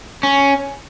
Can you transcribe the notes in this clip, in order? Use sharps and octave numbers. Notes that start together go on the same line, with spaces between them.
C#4